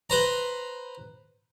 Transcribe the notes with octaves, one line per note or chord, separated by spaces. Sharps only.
B4 C5 A#5